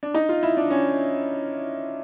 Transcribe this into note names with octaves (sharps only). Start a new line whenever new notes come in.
D4
D#4
F4
E4
D4
C#4